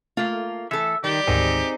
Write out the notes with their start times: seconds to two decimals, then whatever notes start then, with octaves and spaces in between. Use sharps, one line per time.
0.17 A3 A#3 F4
0.71 E3 A4 E5
1.04 D#3 G3 G4
1.27 D2 G#2 D#3 C4 D#4 G#4